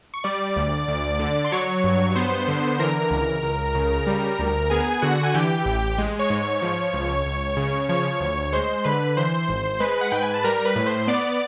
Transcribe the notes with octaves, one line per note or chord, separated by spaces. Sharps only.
C#6
G3 D5 D6
D2
D2
D3
C6
F#3 C#5 C#6
G2
C#6
B3 C5 C6
D3
E3 A#4 A#5
C#2
C#2
C#3
G3
D2
B3 G#4 G#5
D3 F#4 F#5
G#5
E3 G4 G5
A1
G#3
C#5 C#6
G#2
C#5 C#6
F3
C#2
C#2
C#3
F3 C#5 C#6
D2
G#3 C5 C6
D3 B4 B5
E3 C5 C6
G#1
G#3 B4 B5
F#5
G#2 G5
G#5
A5
G3 A#4 A#5
B4 B5
A2
C5 C6
B3 D5 D6